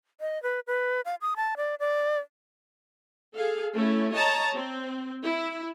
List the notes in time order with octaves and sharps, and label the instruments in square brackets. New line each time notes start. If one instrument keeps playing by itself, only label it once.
[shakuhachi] D#5
B4
B4
F5
D#6
A5
D5
D5
[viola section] G#4 A4 F5
A3 C#4 E4
C#5 D#5 A5 A#5
C4
E4